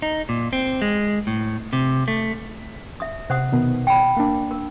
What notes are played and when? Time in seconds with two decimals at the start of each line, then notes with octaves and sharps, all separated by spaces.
0.02 D#4
0.29 A#2
0.53 C4
0.82 G#3
1.27 A2
1.73 C3
2.08 A3
3.00 E5 D#6
3.30 C3 C5 F#5 D#6
3.52 B2 D#3 B3
3.87 G5 B5
4.17 A#3 D4
4.51 A#4